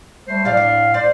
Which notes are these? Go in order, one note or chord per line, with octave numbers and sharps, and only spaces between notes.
G3 A3 C5
A2 F#3 G4 D5 F5
D4
C5 D5